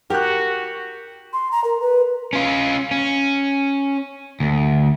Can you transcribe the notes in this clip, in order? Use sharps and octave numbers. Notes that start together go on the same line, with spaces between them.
F#4 G4 A#4 F#6
C6
A#5
A#4
B4
C#4 F4
C#4
D2